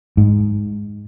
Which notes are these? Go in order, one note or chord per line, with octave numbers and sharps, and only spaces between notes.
G#2